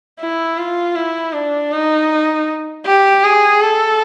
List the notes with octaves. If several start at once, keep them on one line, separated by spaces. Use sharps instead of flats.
E4
F4
E4
D4
D#4
G4
G#4
A4